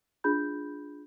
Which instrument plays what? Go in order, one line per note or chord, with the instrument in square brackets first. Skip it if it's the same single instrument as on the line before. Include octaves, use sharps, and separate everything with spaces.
[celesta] D4 F4 G#4 B5 G6